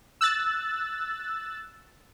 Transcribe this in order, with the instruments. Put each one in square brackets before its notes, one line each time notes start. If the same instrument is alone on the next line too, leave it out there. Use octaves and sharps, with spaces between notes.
[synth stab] E6 F#6 A6